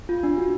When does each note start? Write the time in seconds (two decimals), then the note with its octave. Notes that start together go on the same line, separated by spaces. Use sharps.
0.09 F4
0.23 D4
0.38 F#4